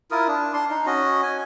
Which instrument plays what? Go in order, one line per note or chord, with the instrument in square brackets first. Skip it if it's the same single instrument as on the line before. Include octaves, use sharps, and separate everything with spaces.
[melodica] E4 F4 A#4 D#6
D4
D4 C6
D#4
C#4 F#4 D#5
G#5